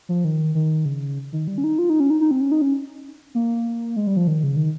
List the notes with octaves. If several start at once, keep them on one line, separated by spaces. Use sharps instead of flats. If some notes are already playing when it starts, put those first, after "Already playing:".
F3
D#3
D#3
C#3
D#3
G3
C#4
D#4
F4
D#4
C#4
D#4
D#4
C4
C#4
D#4
C#4
A#3
G#3
G3
F3
D#3
C#3
D#3